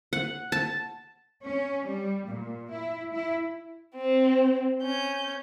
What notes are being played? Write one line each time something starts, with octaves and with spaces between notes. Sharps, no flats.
F#5
A5
C#4
G3
A#2
E4
E4
C4
C#4 G6